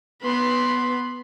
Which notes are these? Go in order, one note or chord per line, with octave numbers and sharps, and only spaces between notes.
B3 B4 B5 C6